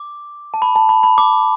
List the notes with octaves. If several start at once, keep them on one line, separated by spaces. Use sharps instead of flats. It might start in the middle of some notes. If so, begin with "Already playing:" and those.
Already playing: D6
A5
B5
A5
B5
B5
D6